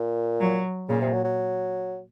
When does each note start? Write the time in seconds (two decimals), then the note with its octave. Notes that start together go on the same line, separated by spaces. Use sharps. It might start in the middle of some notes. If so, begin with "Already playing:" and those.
Already playing: A#2
0.40 F#3
0.89 A#2 C#3
1.01 C3
1.13 F#3
1.24 F#3